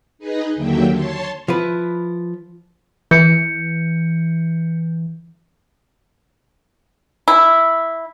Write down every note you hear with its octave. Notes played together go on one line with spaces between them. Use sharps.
D#4 G#4 B4 D#5
D#2 D3 F#3 A#3 E5 G5
C#5 A5 C6
F3 E4 B4
E3 G6 C#7
E4